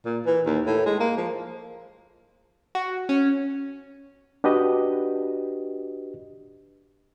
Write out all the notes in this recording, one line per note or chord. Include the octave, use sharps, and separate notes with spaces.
A#2
E3
D#2
A2
G#3
A#3
F3
F#4
C#4
D4 F#4 G4 B4 D#5